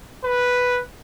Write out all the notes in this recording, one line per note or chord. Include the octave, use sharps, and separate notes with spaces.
B4